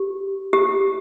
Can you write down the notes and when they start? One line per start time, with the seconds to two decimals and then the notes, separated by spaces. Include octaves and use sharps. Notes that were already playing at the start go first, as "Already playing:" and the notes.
Already playing: G4
0.53 G4